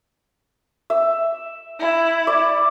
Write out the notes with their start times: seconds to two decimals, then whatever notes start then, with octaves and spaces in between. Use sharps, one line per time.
0.90 E5
1.79 E4
2.27 D5